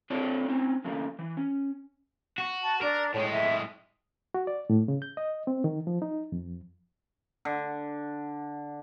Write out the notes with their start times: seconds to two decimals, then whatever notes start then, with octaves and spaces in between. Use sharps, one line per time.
0.10 C4 D4 F4 A4 C#5 D5
0.48 C4 C#4 D#4
0.84 D3 F3 A3 A#3 C#4
1.19 E3
1.37 C#4
2.38 F#4
2.63 A5
2.81 D4 A#4
3.14 A2 G#3 C#5
3.31 E5
4.34 F#4
4.47 D5
4.70 A2
4.88 C#3
5.02 G6
5.17 D#5
5.47 C4
5.64 D#3
5.87 F3
6.02 D#4
6.32 F2
7.45 D3